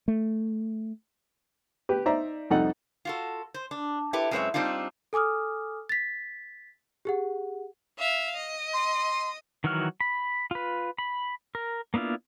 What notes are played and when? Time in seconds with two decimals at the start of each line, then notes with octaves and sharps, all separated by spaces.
0.08 A3
1.89 G4 B4
2.06 D#4 C5 D5 E5 A#5
2.50 C2 F2 D#4 A4 F#5
3.05 F4 F#4 A4
3.54 C5
3.71 D4
4.13 E4 G4 A4 B4
4.31 F#2 G#3 C4 B4 C#5 E5
4.54 G3 C4 D4 D#4 F4
5.13 A4 G#5 D6 D#6 F6
5.89 A6 B6
7.05 G4 G#4 F#5
7.98 E5 F5
8.34 D#5
8.73 C6
9.64 D#3 E3 F#3 F#4 F6
10.00 B5
10.51 F4 B4
10.98 B5
11.55 A#4
11.94 A#3 B3 D4 E4 F4